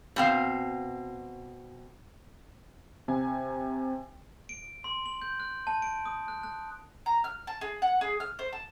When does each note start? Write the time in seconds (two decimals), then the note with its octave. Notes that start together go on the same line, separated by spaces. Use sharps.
0.16 B2 C4 F5
3.08 C3 G#5
4.49 D7
4.84 C6
5.06 F#7
5.22 G6
5.40 F#6
5.67 A5
5.82 D7
6.06 D#6
6.28 F#6
6.43 F#6
7.06 A#5
7.24 F6
7.47 A5
7.61 G#4
7.82 F#5
8.01 G#4
8.20 F6
8.39 C5
8.53 A5